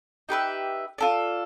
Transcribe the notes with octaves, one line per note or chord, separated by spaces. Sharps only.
D#4 G4 B4 E5
F4 A4 D5